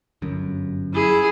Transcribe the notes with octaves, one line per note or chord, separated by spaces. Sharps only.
G1 F#2
E4 G#4